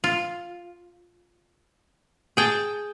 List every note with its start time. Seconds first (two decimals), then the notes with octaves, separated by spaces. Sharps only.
0.04 F4
2.37 G#4 G5 A5